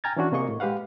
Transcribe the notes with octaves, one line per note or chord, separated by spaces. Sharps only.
G5 G#5 A#5 F6 G#6 A6
E3 C#4 D4 F#4
C3 A#3 G#4 D#5 C#6
A2
G#3 G4 B4 F5 F#5